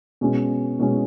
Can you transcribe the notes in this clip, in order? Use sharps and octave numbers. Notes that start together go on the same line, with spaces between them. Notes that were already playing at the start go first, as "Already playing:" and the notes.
B2 G#3 C#4
B2 G#3 C#4